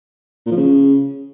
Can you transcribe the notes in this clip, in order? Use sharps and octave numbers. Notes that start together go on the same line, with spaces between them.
A#2
F3
C#3